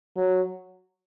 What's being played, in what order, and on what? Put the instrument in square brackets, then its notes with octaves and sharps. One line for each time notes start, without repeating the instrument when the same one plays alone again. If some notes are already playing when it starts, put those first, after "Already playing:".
[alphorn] F#3